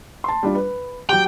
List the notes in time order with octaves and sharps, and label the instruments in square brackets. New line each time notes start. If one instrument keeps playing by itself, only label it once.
[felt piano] A5 C6
G3 D4 F4
B4
[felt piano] F#3 G4 [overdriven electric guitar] G5